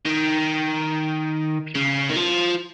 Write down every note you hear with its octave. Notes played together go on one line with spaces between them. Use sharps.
D#3
C#3
D#3
F3